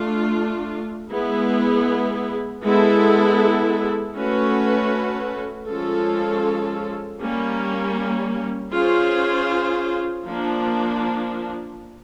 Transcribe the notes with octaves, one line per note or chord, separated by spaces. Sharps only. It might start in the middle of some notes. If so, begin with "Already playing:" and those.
Already playing: A3 D4 F4
G#3 B3 E4 G#4
G#3 B3 E4 A4
A3 C#4 F#4 B4
F3 G#3 C#4 F4 A4
G3 A#3 C#4
C#4 F4 G#4 C5
F3 A#3 D4